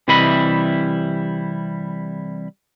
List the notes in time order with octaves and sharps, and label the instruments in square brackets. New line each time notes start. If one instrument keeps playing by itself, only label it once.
[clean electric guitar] C3 E3 G3 E4 D#5 B5